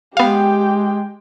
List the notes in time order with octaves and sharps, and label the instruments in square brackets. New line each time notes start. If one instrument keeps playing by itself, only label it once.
[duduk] G#3 [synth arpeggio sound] B3 F5 [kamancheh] G4 G5